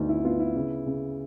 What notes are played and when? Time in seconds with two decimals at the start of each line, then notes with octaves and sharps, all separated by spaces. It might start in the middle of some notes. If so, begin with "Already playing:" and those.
Already playing: D2 B3 D#4
0.09 E4
0.25 B3 F4
0.39 E4
0.56 C#3
0.86 C#3